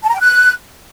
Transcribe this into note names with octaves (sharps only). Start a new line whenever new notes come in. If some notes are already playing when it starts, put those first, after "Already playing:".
A5
A#5
G5
F#6